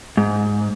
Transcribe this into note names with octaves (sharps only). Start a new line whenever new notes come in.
G#2